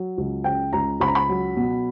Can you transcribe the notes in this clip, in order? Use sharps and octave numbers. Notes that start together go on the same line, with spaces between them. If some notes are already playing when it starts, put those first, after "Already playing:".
Already playing: F#3
C#2
C#3 G5
C#2 A#5
C#2 B5
A#5
B5
F#3
B2